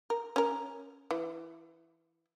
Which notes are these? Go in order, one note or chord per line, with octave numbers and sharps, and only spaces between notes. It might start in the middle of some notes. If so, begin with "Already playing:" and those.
A#4
C#4 A#4
E3